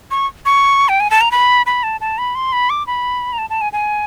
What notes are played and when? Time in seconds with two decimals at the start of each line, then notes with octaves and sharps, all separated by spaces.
0.11 C#6
0.46 C#6
0.89 G5
1.00 G#5
1.11 A5
1.21 A#5
1.31 B5
1.66 B5
1.83 A5
2.01 A5
2.18 B5
2.35 C6
2.53 B5
2.70 D6
2.87 B5
3.33 A#5
3.38 A5
3.50 A5
3.61 G#5
3.73 G#5